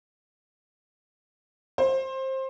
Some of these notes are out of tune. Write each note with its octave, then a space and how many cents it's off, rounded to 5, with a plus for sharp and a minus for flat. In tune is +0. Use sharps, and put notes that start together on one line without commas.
C5 +20